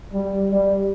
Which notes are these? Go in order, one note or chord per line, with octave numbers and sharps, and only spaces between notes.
G3
G3